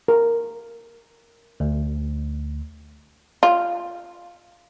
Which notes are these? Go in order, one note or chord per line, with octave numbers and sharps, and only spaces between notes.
A#4
D2
F4